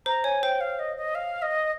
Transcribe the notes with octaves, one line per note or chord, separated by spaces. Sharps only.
C5 A#5
C#5 G#5
C5 G5
F5
D#5
D#5
F5
D#5